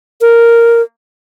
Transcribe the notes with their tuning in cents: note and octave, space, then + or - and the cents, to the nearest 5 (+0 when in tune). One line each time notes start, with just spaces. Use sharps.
A#4 -5